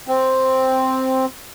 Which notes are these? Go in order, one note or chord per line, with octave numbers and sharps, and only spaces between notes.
C4